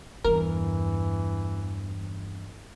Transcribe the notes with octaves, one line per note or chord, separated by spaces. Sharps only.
E2 G2 E3 A#4